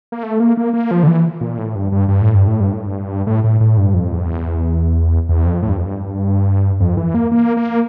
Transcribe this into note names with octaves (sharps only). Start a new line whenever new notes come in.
A#3
A3
A#3
A#3
A#3
F3
D3
E3
A#2
A2
G2
G2
G2
A2
G2
A2
G2
A2
G2
A2
A2
A2
G2
F2
E2
F2
E2
E2
F2
A2
G2
F2
G2
F2
E3
A#3
A#3
A#3